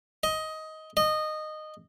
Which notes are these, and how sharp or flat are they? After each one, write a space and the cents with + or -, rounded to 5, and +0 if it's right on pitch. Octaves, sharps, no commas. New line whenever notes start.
D#5 +15
D#5 -15